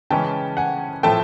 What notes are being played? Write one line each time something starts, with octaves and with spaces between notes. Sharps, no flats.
C#3 E3 G#3 C#4 G5 A5
F#5 G#5
A2 F3 A3 G5 A5